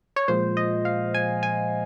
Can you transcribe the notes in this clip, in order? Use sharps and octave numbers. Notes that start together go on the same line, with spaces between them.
C#5
A#2 F3 G#3 C5
D#5
F5
G#5
G#5